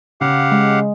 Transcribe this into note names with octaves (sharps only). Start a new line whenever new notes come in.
C#3 G4 F5 F#5
G#3